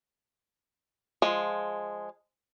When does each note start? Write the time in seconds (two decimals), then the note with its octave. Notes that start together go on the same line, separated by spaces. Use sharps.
1.22 F3 G#3